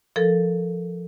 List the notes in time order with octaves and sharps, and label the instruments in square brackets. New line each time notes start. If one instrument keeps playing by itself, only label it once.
[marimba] F3 A4 A#4